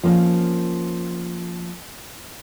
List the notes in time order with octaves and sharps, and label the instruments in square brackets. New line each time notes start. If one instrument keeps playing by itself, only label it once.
[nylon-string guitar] F3 A#3 C#4